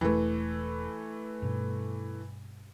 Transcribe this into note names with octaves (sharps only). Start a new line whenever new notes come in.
E1 E3 A3
G2 B2